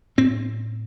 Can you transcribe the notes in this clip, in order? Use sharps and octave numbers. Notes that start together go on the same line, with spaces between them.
A2 C4